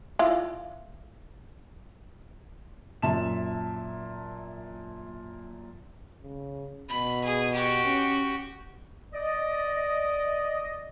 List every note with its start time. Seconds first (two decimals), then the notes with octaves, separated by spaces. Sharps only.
0.19 E4 F4
3.02 F#2 A#2 E5 A5 E7
6.22 C#3
6.89 B2 B5
7.24 G#4
7.54 F#4 G4
7.86 C#4
9.13 D5 D#5